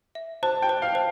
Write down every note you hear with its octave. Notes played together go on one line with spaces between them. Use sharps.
E5
C5 A5
G5
C5
F5
C5